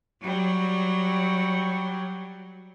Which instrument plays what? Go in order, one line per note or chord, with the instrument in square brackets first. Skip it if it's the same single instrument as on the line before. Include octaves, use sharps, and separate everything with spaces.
[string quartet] F#3 G3